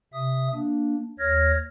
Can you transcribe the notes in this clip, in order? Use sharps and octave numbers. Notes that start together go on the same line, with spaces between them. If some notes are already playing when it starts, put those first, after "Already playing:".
C3 E5 D#6
A#3 D4
D#2 C#5 F6 G#6 A#6